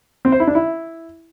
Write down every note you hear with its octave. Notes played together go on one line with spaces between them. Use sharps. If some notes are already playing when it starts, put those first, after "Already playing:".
C4
C5
E4
D4
E4